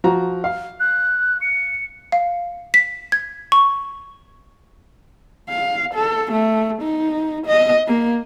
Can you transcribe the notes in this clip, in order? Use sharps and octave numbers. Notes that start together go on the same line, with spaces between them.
F3 F#4 A#5
F5
F#6
C#7
F5
B6
G#6
C#6
F5
A4
A3
D#4
D#5
A#3